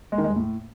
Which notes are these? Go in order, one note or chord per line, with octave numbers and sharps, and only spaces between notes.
G#3
D#3
G#3
G2
A2